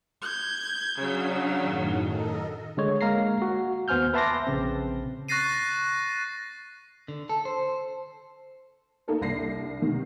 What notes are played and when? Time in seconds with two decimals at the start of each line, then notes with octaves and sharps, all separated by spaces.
0.22 G6 G#6
0.99 C#3 F#3 D4 F5 F#5
1.57 F#2 A2 D#3
2.00 A4 A#4 D#5
2.77 D3 G#3 C#5
3.01 G#3 A#3 F5 A#5 A#6 C7
3.42 F#4
3.88 D#2 B3 C5 G#5 F6 G6
4.14 B4 E5 A5 C6 D6 A#6
4.47 A#1 C#3 C4
5.29 C#6 F#6 A6 A#6 C7 D#7
7.08 D3
7.29 A4
7.45 C5
9.08 A#3 D#4 A4 A#4
9.21 C2 D4 A#6 C7
9.82 C3 D#3